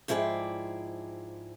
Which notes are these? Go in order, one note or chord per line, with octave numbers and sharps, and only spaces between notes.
G#2 F3 E4 G#4 D5 G5